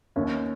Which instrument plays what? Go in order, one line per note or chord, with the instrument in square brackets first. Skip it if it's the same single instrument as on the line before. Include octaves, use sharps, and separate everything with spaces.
[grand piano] D#2 [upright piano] C#4